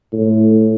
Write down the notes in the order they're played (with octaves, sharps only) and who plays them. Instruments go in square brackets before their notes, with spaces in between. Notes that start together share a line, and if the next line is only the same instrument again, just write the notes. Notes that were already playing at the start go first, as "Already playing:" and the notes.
[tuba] A2